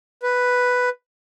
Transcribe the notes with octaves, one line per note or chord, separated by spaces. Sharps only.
B4